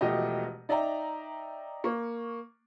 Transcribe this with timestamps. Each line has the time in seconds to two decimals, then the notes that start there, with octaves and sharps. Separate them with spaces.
0.01 E1 B2 F3 A3 G4 D#5
0.69 D#4 D5 E5 G5 A#5
1.84 A#3 C#6